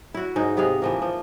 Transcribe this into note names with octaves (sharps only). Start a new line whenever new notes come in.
E4 F#4
G#2 G#3 D#4
C3 B3 G#4 F5
E3 F3 A#3
F3